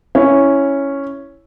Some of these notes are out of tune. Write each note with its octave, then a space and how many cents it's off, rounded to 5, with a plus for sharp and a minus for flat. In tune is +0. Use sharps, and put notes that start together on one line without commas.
C#4 +0 E4 +0